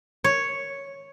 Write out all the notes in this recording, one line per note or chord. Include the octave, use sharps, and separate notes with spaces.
C#5